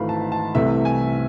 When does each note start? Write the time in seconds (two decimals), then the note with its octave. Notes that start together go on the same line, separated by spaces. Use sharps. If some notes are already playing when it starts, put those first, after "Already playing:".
Already playing: G#1 G#2 E3 A3 F5 B5
0.09 A5
0.32 A5
0.55 C2 C3 E3 A3 E5
0.85 G#5